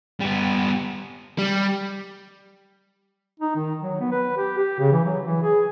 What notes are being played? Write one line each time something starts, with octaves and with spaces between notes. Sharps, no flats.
G3 B3
G3
D#4
D#3
F#3
B3
B4
G4
G4
C#3
E3
F#3
E3
G#4